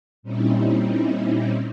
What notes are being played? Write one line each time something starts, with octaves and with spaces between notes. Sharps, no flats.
A#2 G3 C4 C#4 D#4 E4